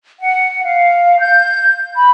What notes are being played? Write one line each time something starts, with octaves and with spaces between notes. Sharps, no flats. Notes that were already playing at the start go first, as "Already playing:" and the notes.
F#5
F5
G6
B5